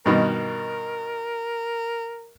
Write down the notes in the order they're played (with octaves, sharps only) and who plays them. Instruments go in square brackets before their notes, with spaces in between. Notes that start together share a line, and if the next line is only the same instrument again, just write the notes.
[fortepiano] G2 B2 D#3 [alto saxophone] A#4